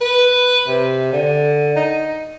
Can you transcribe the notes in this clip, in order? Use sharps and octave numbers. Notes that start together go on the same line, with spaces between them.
B4
C3
D3
D#4